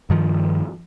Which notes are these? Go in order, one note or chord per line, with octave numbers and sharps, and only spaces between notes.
G2 D#3 F3